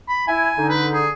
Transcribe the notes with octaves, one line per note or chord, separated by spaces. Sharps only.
B5
E4 G#5
D3 D#4
B4
G#4